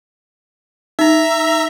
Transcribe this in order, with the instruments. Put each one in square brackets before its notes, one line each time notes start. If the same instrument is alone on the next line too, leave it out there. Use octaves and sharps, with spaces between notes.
[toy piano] D#4 [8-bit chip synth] E5 A#5